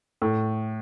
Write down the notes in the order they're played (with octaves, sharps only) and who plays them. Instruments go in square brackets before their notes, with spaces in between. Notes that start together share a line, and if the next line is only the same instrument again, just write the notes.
[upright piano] A2